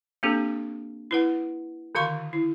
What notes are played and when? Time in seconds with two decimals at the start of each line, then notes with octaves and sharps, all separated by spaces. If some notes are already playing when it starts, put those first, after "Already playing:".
0.23 A#3 C4 D4 G4 A4
1.11 E4 B4 F#5
1.95 D3 D#3 F#4 F5 C6 C#6
2.33 E4